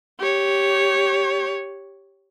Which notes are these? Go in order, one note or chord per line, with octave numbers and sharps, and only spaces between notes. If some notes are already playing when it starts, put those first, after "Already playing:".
G4 C#5